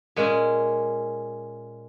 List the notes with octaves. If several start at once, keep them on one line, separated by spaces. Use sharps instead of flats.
A#2 G#3 C#4